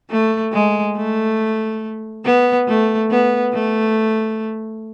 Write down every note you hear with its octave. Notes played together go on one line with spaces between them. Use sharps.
A3
G#3
A3
B3
A3
B3
A3